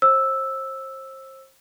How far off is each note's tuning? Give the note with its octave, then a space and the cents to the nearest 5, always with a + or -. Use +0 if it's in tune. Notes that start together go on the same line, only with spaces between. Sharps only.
C5 +35 E6 +0